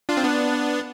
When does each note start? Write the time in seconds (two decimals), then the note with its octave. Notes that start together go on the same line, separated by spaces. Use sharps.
0.09 D4 F4
0.17 C4
0.24 B3 D4